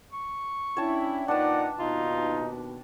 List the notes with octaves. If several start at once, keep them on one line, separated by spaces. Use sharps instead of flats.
C#6
C#4 D4 E4 C#5 G5 A5
A#2 D4 D#4 B4 D5 F#5 A5
D#2 B2 D#4 F4